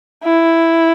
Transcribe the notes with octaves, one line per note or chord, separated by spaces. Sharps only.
E4